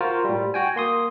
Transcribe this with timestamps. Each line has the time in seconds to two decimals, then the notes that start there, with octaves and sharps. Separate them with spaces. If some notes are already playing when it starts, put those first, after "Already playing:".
0.01 F4 F#4 A#4 C5
0.25 A2 G3
0.54 F#4 G5 G#5
0.76 A#3 C6 D#6